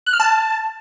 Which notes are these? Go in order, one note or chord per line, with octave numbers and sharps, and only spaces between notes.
F#6
F6
A5